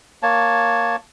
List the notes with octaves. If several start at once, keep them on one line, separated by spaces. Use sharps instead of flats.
A#3 C#5 A5